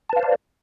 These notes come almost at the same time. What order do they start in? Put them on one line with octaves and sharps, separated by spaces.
A5 B4 F5 C5 D5